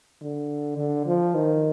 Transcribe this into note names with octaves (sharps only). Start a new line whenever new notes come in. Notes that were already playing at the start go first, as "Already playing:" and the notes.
D3
D3
F3
D#3